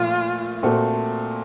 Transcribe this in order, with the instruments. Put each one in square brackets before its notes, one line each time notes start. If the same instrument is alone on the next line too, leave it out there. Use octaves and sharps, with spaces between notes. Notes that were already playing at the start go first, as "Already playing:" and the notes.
Already playing: [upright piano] A#2 F3 A3 [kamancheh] F4
[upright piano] A#2 A3 C4 F#4 A4